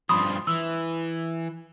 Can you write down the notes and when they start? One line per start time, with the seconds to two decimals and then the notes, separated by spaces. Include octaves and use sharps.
0.09 G2 F3 B5 C6 D#6
0.47 E3 E6